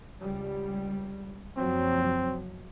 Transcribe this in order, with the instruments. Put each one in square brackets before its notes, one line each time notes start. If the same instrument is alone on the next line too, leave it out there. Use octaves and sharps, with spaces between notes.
[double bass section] C#2 G3
[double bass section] F#1 F3 F#3 [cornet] C4